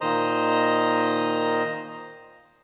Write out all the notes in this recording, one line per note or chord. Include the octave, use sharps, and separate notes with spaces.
A#2 D#3 C5 D#5 A#5